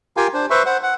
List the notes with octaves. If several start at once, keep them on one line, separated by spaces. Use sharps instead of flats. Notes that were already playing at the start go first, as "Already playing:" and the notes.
F4 G4 A#4 F5 G5 G#5
D4 C5
B4 C5 E5 C6 C#6
C5 F#5
F#5